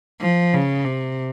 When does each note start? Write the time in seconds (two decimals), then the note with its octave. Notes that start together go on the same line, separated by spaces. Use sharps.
0.22 F3
0.54 C#3
0.85 C3